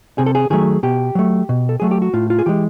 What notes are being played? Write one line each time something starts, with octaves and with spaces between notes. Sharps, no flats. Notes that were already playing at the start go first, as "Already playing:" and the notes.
C3 G#4
A4
G#4
D#3 F#3 A3 G#4
B2 G4
F#3 A3
B2
A4
F#3 A3 G#4
G4
F#4
A2 F4
F4
G#4
E3 G#3 G4